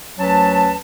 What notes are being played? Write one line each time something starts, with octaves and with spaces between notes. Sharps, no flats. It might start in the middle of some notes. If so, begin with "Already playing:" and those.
D2 F#3 C#4 B4 A5